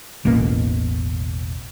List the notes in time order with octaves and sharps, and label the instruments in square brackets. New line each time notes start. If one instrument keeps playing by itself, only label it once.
[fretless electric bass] E1 A1 B2 A#3